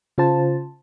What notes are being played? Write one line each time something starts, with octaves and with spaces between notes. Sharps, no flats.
C#3 F4 C5 A5